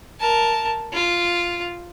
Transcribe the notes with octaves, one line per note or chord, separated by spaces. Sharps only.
A#4 A5
F4